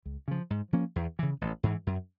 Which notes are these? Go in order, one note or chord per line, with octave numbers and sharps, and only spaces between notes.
C#2
C#3 F3
G#2
F3 A#3 C#4
E2
C#3 E3
A1
G#2 E3
F#2